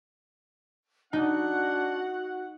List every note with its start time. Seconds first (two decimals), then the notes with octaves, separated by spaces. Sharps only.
1.13 D4 D#4 F#4 F#5